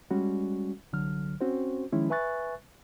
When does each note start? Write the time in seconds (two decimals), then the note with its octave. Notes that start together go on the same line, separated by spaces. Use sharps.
0.11 G3 G#3 C#4 F#4
0.93 C2 D3 F#3 F6
1.41 C4 C#4 F#4 C5
1.92 D#3 F3 G#3 C#4 E4
2.10 B4 E5 G#5 C#6 F#6 A6